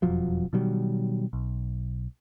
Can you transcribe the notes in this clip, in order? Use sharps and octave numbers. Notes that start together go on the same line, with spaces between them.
E1 F2 F3 F#3
B2 D#3 F#3 G3
B1